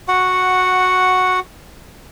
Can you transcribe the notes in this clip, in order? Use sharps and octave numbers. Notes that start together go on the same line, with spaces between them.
F#4 F#5